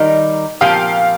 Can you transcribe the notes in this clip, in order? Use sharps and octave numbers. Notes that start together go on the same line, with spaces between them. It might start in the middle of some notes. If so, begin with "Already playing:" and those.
Already playing: D#3 G3 D#4 A#4
A#2 F3 C4 G4 A#4 F5